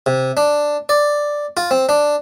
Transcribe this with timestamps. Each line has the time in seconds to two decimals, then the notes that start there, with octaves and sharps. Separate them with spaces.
0.06 C3
0.37 D4
0.89 D5
1.57 F4
1.71 C4
1.89 D4